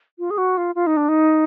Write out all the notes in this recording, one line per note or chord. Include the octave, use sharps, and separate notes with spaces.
F4
G#4
F#4
F4
F4
D#4
D4
D#4